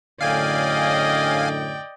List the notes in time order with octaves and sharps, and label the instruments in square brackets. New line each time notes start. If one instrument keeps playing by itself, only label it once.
[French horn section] F#2 A2 D3 [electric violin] D5 G5 [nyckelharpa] D#5 [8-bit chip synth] F5 G#5